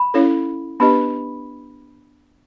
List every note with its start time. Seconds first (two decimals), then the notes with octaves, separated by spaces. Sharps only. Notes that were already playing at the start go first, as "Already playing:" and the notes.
Already playing: B5
0.14 C#4 E4 A4 C#5 F5
0.80 B3 D4 G4 B4 D#5 B5